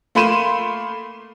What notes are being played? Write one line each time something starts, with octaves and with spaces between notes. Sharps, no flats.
A3 A#3 B5 C6 D#7 E7